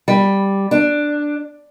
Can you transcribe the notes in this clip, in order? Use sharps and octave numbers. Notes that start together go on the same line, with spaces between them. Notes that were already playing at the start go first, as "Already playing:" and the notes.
G3
D4